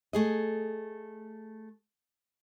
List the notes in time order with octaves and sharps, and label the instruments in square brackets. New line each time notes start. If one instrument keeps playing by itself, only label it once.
[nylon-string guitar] A3 G#4 D#5